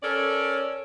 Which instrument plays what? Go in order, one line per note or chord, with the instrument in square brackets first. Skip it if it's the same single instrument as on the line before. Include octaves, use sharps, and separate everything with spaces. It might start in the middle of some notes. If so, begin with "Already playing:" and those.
[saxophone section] C#4 A4 A#4 C#5 D5